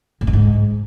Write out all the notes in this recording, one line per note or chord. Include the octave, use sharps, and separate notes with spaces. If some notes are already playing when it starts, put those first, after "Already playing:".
B2
G2
G#2